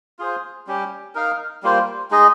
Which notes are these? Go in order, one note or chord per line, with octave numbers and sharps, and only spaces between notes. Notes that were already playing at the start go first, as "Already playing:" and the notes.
F4 G#4 C5
G3 C#4 G4
D#4 A#4 F5
G3 A#3 F4 C5
G#3 D#4 G#4 D#5